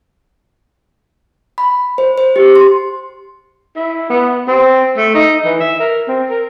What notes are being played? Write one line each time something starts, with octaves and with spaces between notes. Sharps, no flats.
B5
C5
C5
G4
C6
E4
B3
C4
A3
D#4
E3
E5
A#4
C4
A#4